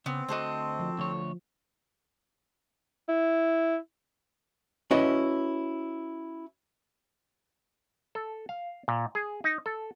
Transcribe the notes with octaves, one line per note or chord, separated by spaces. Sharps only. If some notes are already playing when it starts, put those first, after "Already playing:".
C#3 B3 C4
D2 F#4 A4 C5 D#5
F3
D2 F3 C#5
E4
C#4 E4 F#4 B4 D#5
A4
F5
A#2
G#4
D#4
A4